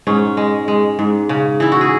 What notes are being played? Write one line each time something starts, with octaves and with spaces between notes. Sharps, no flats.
G#2 C#4
G#3
G#3
G#2
C#3
E3 E4
F#4
G#4